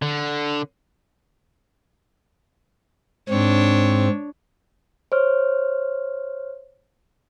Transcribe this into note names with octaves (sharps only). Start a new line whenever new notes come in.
D3
G#2 C4 D4 C#5
C5 C#5 F6